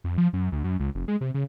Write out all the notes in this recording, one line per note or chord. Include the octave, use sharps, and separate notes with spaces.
F2
F3
F#2
D2
F#2
C#2
F1
G#3
C3
C#3